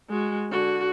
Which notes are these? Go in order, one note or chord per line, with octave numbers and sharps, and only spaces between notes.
G#3 F#4
D3 F#4